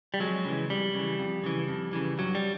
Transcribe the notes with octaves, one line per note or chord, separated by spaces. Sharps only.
G3
F2 F#3 G#3
C#3 E3
F2 G3
C#3 E3
F2
C#3 E3
F2
C#3 E3
G2 F#3
G3